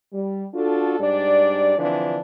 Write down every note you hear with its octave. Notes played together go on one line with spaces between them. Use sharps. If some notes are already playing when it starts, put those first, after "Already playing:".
G3
D4 F4 F#4 A4
G#2 G3 D4 D5
D3 E3 F3 C4 D4